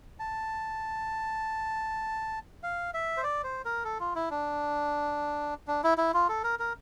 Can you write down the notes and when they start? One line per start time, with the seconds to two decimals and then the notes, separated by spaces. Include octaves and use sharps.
0.20 A5
2.63 F5
2.94 E5
3.17 C5
3.23 D5
3.44 C5
3.65 A#4
3.84 A4
4.00 F4
4.15 E4
4.31 D4
5.68 D4
5.84 E4
5.98 E4
6.14 F4
6.29 A4
6.44 A#4
6.59 A#4